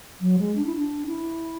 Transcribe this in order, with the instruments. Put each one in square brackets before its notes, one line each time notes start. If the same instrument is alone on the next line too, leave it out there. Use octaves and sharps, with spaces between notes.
[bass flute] F#3
G#3
D4
E4
D4
E4